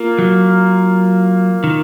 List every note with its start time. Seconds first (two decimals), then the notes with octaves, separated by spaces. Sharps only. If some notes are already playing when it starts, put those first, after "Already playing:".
Already playing: A#3 F4
0.19 F#3
1.64 D#3